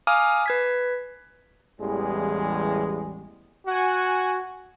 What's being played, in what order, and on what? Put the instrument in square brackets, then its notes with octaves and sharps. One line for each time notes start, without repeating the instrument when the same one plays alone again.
[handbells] F5 G#5 A#5 D6 D#6 F6
B4 G#6 B6
[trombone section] A1 E2 G3 G#3 G4 G#4
[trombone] F#4 [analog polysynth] F#5 G#5